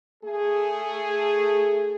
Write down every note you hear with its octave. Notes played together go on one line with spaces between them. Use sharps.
A3 G#4